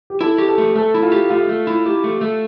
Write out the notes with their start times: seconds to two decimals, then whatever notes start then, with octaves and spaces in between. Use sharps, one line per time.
0.10 G4
0.21 E4 A4
0.38 G4
0.49 A4
0.58 A3
0.75 A3 A4
0.94 E4
1.03 F4
1.12 G4
1.30 A3 F4
1.49 A3
1.67 E4
1.86 G4
2.04 A3
2.21 A3